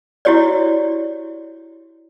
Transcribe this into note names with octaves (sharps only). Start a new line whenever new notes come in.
E4 F#4 G4 C#5 D5